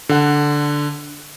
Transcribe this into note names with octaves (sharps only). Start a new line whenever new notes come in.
D3 F#5